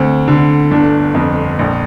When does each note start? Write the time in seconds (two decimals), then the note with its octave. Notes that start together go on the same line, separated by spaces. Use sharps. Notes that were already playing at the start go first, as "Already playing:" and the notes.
Already playing: D2 C4
0.28 D3
0.71 G1 D4
1.14 F2
1.59 A#1